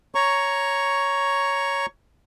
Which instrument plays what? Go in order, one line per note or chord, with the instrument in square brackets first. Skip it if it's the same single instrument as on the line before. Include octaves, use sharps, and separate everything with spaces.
[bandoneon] C#5 A#5 C#6